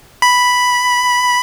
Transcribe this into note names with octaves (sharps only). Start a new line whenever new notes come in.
B5